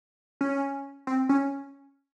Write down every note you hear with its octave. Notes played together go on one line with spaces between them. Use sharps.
C#4
C4
C#4